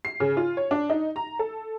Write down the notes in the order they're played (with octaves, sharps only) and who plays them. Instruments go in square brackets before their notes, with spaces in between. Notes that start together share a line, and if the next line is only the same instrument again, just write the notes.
[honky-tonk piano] C7
C#3
F4
C#5
D4
D#4
A#5
A4